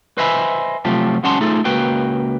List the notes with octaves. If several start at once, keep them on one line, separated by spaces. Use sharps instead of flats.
B4 C5 D#5 E5 G#5 B5
C3 F3 F#3 A3 F4 G4
F#3 G#3 C#4 F#5 A5 C6
A3 D#4 F4 G#4 A4
C#2 A#3 F#4 B4 G5